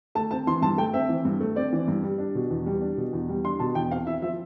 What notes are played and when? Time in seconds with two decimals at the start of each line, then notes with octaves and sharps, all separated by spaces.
0.15 A3 A5
0.31 C4 A5
0.47 E3 C6
0.62 G2 A5
0.78 A3 G5
0.94 C4 E5
1.09 E3
1.25 G2
1.40 A3
1.56 C4 D5
1.73 E3
1.88 G2
2.04 G3
2.18 D4
2.35 B2
2.50 E2
2.66 G3
2.82 D4
2.97 B2
3.13 E2
3.29 G3
3.44 D4 C6
3.60 B2 A5
3.75 E2 G5
3.91 C4 F5
4.07 E4 E5
4.22 F3 E5